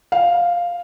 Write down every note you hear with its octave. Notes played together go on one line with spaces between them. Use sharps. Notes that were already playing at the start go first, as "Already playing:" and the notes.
F5